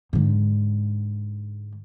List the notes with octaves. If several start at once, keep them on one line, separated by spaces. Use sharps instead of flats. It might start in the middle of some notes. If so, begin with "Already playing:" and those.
G#2 D3